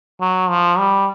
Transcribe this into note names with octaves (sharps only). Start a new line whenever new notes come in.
F#3
F3
G3